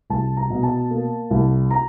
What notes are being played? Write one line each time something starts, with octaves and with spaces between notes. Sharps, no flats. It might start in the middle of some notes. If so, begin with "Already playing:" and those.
C2 A5
A#5
B2
A5
A#3
C2
A#5